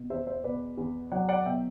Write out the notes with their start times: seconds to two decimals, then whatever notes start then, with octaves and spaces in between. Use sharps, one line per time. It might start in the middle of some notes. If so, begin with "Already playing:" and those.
Already playing: B2
0.10 E2 C5 E5
0.27 C5 E5
0.44 B2 B4 D5
0.77 E2
1.12 F#3 D5 F#5
1.29 D5 F#5
1.46 B2 E5 G5